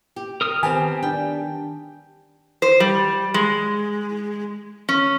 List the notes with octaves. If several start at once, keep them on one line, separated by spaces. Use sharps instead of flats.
G4
A#4 D#6 F6
D#3 B3 C4 D#4 G4 G#5 A5
G3 D4 G5
C5
G3
G#3
C#4